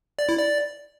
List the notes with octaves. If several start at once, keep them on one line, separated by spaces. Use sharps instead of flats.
D5
E4
D5